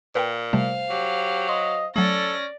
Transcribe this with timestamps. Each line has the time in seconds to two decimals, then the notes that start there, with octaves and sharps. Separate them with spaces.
0.15 A#2 B4 F5 G5
0.53 C3 G3 A3 C5 F5
0.90 F#3 G4
1.49 D#5 C6
1.96 F#3 A3 C#4 A4 D5 A#6